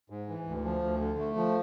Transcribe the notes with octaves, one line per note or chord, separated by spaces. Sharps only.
G#2
E3
D2
F3
D2
D3
A3
F3